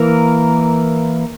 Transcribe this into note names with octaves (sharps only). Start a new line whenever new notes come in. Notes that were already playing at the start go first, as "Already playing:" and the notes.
Already playing: E3 A#3 A#4